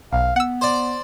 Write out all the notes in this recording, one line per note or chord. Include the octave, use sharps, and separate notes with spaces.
B1 F5
B3 F#5 E6
C5 D5